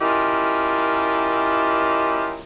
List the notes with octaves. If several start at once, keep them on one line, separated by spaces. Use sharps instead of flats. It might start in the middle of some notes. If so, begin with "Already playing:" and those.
C#4 E4 F4 G4 A#4 D#5